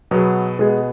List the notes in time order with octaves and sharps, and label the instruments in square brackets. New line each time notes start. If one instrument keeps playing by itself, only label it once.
[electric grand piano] B2 B3 G#4 [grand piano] F#3
[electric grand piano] B2 B3 G#4 [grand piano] G#3